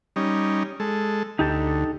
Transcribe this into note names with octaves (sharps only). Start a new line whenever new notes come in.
G3 C#4 D#4
G#3 A4
D2 D#4 G4 A4